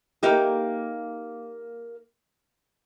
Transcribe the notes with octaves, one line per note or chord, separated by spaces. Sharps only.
A#3 D#4 G4